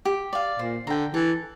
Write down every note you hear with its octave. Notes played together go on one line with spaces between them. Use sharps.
G4
D5 F5
A#2 C5
D3 G5 A#5
E3 A4